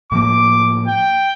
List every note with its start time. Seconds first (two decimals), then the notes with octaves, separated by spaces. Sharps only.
0.12 A2 F3 A#3 D6
0.87 G5